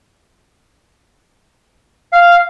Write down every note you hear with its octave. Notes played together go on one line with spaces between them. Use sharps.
F5